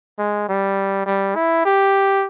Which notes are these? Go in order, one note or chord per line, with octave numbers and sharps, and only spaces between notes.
G#3
G3
G3
E4
G4